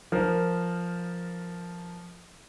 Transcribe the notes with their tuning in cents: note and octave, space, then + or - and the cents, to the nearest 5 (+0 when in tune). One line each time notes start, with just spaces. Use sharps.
F3 +0 A#4 -5